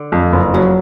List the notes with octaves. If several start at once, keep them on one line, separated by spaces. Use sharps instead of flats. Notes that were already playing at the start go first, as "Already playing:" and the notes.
Already playing: D3
F2
F#1
C#3 F#3